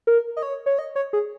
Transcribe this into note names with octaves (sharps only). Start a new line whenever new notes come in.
A#4
D#5
C#5
C#5
D#5
C#5
G#4